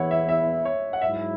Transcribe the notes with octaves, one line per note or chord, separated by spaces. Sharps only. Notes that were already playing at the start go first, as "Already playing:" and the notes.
Already playing: E2 E3 B3 E4 C#5 F#5
E5
E5
C#5
F#5
G#2 F#3 E4 E5